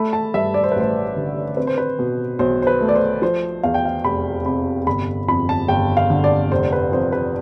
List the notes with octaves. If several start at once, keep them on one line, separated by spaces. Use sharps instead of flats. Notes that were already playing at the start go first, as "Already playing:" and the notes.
Already playing: A3 B5
A5
G2 E5
D5
C5
B4
A1 C5
D3
C4 B4
C5
B4
B2
B1 C5
C5
B4
A3
D5
C5
F3 C5
E2 F5
G5
F5
F1 B5
C3 B5
G1 B5
F2 B5
A5
G1 G5
F5
D3
D5
F1 C5
B4
F2 C5
B4